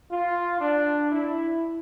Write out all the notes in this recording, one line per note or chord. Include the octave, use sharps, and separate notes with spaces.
F4
D4
E4